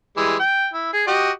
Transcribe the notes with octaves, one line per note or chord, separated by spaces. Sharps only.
E3 G3 G#3
G5
E4
G#4
F#4 G4 D#5